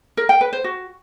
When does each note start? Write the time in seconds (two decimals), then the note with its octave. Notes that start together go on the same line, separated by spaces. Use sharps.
0.17 A#4
0.29 G5
0.41 B4
0.53 C5
0.64 F#4